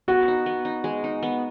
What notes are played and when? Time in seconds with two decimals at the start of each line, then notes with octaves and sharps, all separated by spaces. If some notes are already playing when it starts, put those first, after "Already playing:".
0.08 B3 F#4
0.28 D#4
0.46 B3
0.65 D#4
0.84 G#3
1.04 D#4
1.23 B3